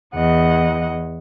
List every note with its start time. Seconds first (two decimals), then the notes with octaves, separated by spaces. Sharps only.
0.15 E2 D#5 F#5